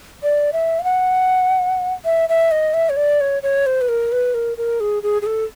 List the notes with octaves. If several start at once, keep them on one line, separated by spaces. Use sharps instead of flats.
D5
E5
F5
F#5
E5
E5
D#5
E5
C#5
D5
C#5
C#5
C5
B4
A#4
B4
A#4
A#4
G#4
G#4
G#4
A4